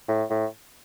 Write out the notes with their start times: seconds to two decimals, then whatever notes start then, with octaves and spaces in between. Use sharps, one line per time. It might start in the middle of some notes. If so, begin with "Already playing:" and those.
0.08 A2
0.30 A2